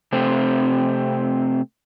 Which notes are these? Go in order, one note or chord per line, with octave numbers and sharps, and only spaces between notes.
C3 A3 C4